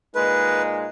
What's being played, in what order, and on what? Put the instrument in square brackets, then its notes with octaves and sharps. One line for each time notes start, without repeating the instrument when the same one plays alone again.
[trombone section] A#2 G#3 D#4 [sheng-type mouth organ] B4